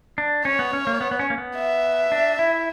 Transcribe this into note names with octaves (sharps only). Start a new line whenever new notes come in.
D4
C#4 C#5
B3
C#4
A#3
B3
B3
C#4
A#3
B3
E5
D4
E4